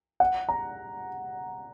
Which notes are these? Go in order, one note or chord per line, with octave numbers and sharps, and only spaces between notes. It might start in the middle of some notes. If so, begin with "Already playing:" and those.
F#5
A#5